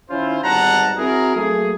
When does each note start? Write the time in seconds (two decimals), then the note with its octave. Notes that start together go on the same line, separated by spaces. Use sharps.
0.10 D#3 C#4 E4 F4 C5
0.43 G#1 B2 G3 F#5 A5 A#5
0.98 C4 E4 F#4 G#4 A#4
1.35 F#3 A3 A#3 G#4